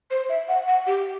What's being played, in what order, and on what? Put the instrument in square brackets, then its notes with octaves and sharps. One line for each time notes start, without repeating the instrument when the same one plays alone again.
[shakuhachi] C5
E5
F#5
F#5
G4